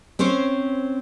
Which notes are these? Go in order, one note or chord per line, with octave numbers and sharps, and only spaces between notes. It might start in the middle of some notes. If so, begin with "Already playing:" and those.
C4 C#4 C5 C#5